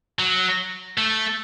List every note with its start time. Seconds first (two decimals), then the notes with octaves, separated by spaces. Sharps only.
0.19 F#3
0.98 A3